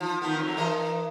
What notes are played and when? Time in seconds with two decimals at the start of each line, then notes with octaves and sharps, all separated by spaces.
0.01 F3
0.22 D#3 F3 B3
0.39 F2 F#3
0.57 E3 A#4 D#5